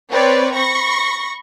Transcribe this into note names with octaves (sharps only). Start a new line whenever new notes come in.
C4 B4 C#5 D5
B5 C#6 A#6